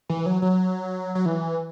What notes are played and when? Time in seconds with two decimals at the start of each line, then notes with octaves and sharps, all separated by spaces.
0.10 E3
0.26 F#3
0.42 F#3
1.15 F#3
1.26 E3